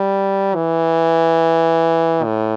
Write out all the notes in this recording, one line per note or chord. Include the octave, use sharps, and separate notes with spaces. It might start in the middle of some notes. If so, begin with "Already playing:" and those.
Already playing: G3
E3
A2